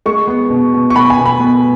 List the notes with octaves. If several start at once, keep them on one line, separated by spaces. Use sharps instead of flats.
G#3 C#6
B3
B2
B2
C#6
B3 B5
G#5
B2
B5
B3